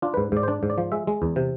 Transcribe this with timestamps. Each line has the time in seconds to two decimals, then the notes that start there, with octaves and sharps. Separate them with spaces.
0.02 D4 F4
0.14 G#2 B4
0.32 G#2 D5
0.43 C5
0.48 D4 D5
0.63 G#2
0.70 D5
0.78 F3
0.92 G#3 E5
1.07 G#3
1.22 E2
1.36 C3